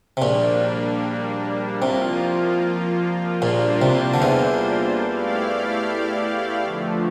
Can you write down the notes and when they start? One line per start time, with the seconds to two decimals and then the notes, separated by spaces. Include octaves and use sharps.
0.17 C3
0.22 A#1 A#2 G3 A#3 D4
1.81 C2 C3 F3 A#3 F4
3.42 A#1 A#2 G3 A#3 D4 F4 C5
3.82 C2 C3
4.14 D3
4.22 E2 E3
5.02 A3 E4 G4 D5 F5
6.62 D3 F3 A3